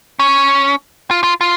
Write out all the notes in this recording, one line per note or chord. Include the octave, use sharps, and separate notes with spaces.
C#4
F4
F4
F4